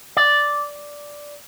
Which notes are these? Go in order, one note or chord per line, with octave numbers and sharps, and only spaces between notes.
D5